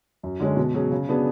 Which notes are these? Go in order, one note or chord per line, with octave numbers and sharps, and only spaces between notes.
F#2
D3 G#3 C#4
B2
F#3 C#4 G#4
C#3
F#3 B3 D4 G#4